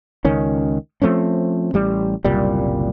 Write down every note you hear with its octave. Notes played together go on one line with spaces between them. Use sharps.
C#2 D#3 C#4
F3 A3 C4 C#4
A1 G3
F#1 C2 A#2 G3